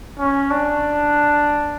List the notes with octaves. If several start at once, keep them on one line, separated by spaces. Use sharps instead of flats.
C#4
D4